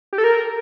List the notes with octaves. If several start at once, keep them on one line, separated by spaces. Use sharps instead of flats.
G4
A4
A#4